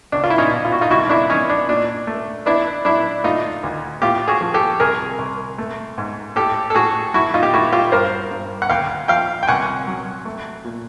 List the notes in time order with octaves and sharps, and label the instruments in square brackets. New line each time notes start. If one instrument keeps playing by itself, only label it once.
[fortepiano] C#2 D4
F4
E4
C#4 D#4
B2
F4
F#4
D#4 F4
C2 E4 F#4
D4 E4
E3 C#4 D#4
D4
A#2 D4
A3
B3 D4 E4
F#3 D4 E4
A3 D#4 F4
D2
A2 F4 G4
F#4 G#4
F3
G4 A4
C2 G#4 A#4
C2
A3
G#2
A2 G4 A4
A4
A2 F#4 G#4
F#3 E4 F#4
D#4 F4
G4
A3 E4 F#4
F4 G4
G2 A#4 C5
G2
F#5
D2 F5 G5
F3 F5 G5
G5
C2 F#5 G#5
F#3
A3
A#2